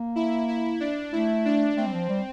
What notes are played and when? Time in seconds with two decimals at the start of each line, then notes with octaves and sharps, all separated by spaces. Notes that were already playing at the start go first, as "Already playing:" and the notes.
Already playing: A#3
0.16 E4
0.48 E4
0.80 D4
1.12 A3 E4
1.45 D4
1.77 A3 C4
1.86 G3
1.93 F3
2.09 G3